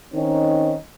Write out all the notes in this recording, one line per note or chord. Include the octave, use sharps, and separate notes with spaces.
D#3 C4 C#4 D#4